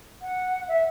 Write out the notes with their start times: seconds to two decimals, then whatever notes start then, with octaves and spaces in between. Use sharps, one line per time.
0.22 F#5
0.68 E5